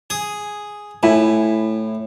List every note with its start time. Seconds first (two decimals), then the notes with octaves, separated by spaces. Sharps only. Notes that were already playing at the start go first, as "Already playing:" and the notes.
0.10 G#4
1.03 A2 E4 G#5 B5